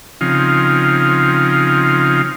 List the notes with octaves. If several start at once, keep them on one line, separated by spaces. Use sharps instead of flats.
C#3 F3 C4 D#4 F4